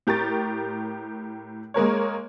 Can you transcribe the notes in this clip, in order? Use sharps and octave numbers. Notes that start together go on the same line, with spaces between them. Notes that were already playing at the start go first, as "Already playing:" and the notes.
A2 G4 A#4 C#6 A6
G#3 A#3 A#4 C#5